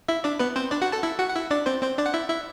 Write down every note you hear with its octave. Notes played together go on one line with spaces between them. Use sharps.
E4 E5
D4 D5
B3 B4
C4 C5
D4 D5
F#4 F#5
A4 A5
E4 E5
F#4 F#5
F#5
E4 E5
D4 D5
C4 C5
C4 C5
D4 D5
F#5
E4 E5
E4 E5